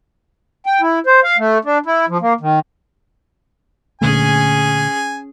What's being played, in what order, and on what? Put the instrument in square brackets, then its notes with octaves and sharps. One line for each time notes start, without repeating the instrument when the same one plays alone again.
[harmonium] G5
E4
C5
F5
A3
D4
E4
F3
A#3
D#3
[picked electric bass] A#2 D3 A3 [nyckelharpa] C#4 G#4 [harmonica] G#5